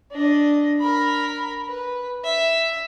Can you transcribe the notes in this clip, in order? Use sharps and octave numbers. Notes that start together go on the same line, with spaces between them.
D4 D#5
A#4 B5
B4
E5